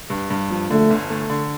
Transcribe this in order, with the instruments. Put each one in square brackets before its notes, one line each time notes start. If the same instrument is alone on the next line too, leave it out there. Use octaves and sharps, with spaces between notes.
[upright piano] G2
G2
F3
[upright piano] D3 [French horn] A3
[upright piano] G1
A3
D3